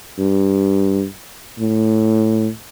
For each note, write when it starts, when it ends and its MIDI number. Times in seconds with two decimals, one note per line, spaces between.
0.19 1.04 43
1.59 2.48 45